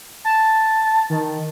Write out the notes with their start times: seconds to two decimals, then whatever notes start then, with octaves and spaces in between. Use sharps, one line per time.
0.25 A5
1.10 D#3